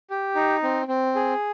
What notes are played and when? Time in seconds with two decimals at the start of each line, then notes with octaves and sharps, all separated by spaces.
0.10 G4
0.36 D#4
0.63 C4
0.88 C4
1.15 G#4